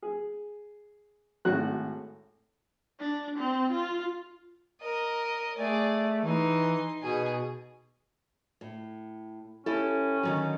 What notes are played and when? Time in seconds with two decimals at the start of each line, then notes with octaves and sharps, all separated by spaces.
0.02 G#4
1.45 G#1 A2 F#4 F#6
3.00 D4
3.39 C4
3.72 F4
4.81 A#4 D#5
5.57 A3 G#4 D5
6.24 E3 D#4 C6
7.02 B2 G#4
8.61 A2
9.66 C#4 E4 G4 A4
10.23 D3 D#3 F#3